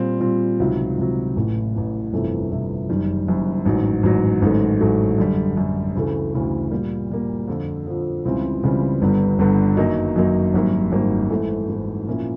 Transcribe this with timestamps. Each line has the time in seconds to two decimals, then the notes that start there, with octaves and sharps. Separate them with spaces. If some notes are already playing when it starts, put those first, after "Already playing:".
Already playing: A#2 G3 C4 F4
0.21 A#2 G3 C4 F4
0.60 C#2 C3 D#3 F#3
0.98 C#2 C3 D#3 F#3
1.36 A1 A2 E3
1.75 A1 A2 E3
2.13 G1 F2 C3 E3 A3
2.50 G1 F2 C3 E3 A3
2.89 F#1 F#2 D#3 G3
3.28 F#1 F#2 D#3 G3
3.66 A1 G#2 D#3 F#3
4.03 A1 G#2 D#3 F#3
4.42 A1 G#2 D#3 F#3 A3
4.80 A1 G#2 D#3 F#3 A3
5.18 F#2 D3 G3
5.56 F#2 D3 G3
5.94 D2 C#3 E3 A3
6.34 D2 C#3 E3 A3
6.71 A#2 G3 A#3
7.10 A#2 G3 A#3
7.48 F2 D3 F3
7.86 F2 D3 F3
8.25 C#2 C#3 E3 G3 C4
8.63 C#2 C#3 E3 G3 C4
9.02 G1 G2 D3 G3 B3
9.39 G1 G2 D3 G3 B3
9.77 F#2 D#3 F#3 A#3 D#4
10.16 F#2 D#3 F#3 A#3 D#4
10.53 G#1 F#2 D#3 G3 A#3
10.92 G#1 F#2 D#3 G3 A#3
11.30 G#2 E3 A3
11.68 G#2 E3 A3
12.07 A#2 F3 A#3 C#4 E4